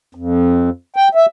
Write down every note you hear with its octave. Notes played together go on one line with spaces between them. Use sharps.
F2
G5
E5